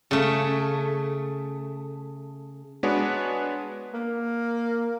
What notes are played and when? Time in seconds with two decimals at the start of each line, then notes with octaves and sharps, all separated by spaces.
0.11 C#3 A3
2.83 G#3 B3 D4 F#4 B4 C#5
3.94 A#3